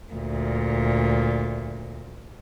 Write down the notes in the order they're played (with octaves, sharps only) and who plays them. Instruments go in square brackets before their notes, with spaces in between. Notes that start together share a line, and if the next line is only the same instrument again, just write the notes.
[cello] D2 A#2